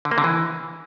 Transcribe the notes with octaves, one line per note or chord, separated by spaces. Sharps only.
D3
A#3
D3
E3